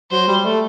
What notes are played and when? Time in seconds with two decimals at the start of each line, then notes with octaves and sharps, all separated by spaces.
0.11 F#3 C5
0.28 G3
0.45 A3